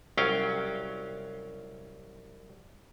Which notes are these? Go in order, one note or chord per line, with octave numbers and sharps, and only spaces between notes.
C2 F#3 C#4 F5 G5